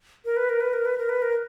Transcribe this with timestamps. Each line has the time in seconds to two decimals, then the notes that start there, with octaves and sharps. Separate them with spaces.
0.25 A#4
0.37 B4
0.49 A#4
0.60 B4
0.73 A#4
0.85 B4
0.98 A#4
1.09 B4
1.22 A#4